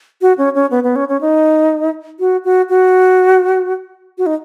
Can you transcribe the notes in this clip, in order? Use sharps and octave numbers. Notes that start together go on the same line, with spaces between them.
F#4
C#4
C#4
B3
B3
C#4
C#4
D#4
F#4
F#4
F#4
F#4
D#4